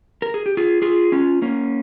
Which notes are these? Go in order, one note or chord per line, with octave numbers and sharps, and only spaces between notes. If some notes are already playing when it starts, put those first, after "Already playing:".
A#4
G#4
G4
F4 G#4
F4 G#4
C#4 F4
A#3 C#4